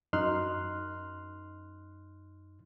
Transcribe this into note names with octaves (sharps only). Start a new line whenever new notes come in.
F#2 D#4 C6 F6 F#6